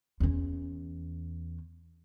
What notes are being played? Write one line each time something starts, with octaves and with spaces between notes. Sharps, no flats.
E2 C#4